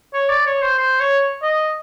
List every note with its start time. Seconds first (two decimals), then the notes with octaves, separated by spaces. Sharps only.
0.13 C#5
0.30 D5
0.46 C#5
0.62 C5
0.78 C5
1.00 C#5
1.43 D#5